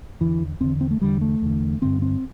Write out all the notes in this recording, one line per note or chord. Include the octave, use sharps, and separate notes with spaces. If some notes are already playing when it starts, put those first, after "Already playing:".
E2 D3 E3
E2 D3 C4
C4
A3
E2 D3 G3
A3
E2 D3
G2 D3 C4
C4